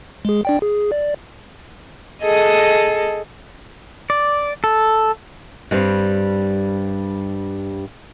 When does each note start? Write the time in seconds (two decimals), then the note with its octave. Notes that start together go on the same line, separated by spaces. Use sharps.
0.25 G#3 G#4
0.45 D4 D5 G5
0.62 G#4
0.92 D5
2.23 G#4 A4 D#5
4.10 D5
4.64 A4
5.71 G2 G3 C4